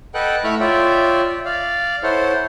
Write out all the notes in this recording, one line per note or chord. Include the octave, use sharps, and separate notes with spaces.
A4 B4 D#5 F#5 G5 F#6
A3 E4 F#5 B5 C#6 F6
F4 C#5 D5 E5 G5
D5 F5
E4 A4 C5 C#5 F#5